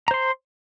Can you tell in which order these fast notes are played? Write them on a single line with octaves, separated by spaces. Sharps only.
A#5 C5 C6